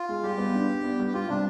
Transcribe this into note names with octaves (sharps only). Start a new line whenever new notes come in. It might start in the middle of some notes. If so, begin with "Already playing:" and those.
Already playing: F4
G#3
G3 G4
B3
D4
D4
B3
G3
G4
G3 F4
C3 D4